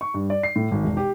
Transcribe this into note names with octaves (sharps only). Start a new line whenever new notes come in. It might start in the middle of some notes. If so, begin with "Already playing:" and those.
C#6
G2
D5
C7
A2
G#1
E1
G4